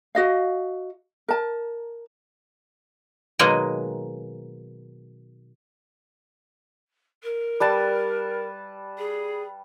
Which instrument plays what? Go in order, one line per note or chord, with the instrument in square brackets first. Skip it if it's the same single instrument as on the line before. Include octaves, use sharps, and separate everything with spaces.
[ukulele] F#4 D#5 F5
A#4 A5
[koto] B2 D#3 F#3 G#3 A#3 D#5
[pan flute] A#4
[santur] G3 B4 A5
[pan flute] G#4